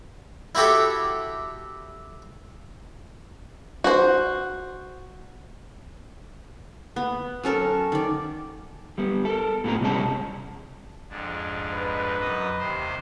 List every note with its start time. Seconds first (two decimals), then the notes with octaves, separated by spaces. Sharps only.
0.55 E4 F#4 G4 A4
3.84 F#4 C5
6.96 B3
7.43 F#3 C#4 A4 A#4
7.92 D#3 D5
8.98 G3 B3
9.25 A4 A#4
9.64 A2 B3 F4 G#4 A#5
9.81 C3 G3 G#3 C#4 C#5 A5
11.10 F2 G#2 D4
11.72 D#4 B4
12.20 F#2 D#5
12.58 D#2 C3 C5